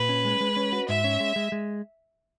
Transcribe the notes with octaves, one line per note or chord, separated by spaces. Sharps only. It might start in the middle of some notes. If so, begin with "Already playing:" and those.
Already playing: A#2 B4
C#4
G#3
G#3
C#4
F#4
G#2 E5
C#4
G#3
G#3
G#3